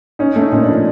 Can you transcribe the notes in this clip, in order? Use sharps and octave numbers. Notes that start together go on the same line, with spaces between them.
C#4 D#4
A3
D#4
A#2 C#4
D4
F3